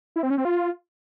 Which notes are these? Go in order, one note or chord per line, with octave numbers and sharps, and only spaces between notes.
E4
C4
C#4
C4
F4